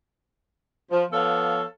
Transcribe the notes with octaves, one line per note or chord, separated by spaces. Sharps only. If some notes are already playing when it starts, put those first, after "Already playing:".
F3
F3 B3 A4 C#5 F5